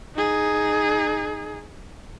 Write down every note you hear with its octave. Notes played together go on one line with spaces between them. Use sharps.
D#4 G#4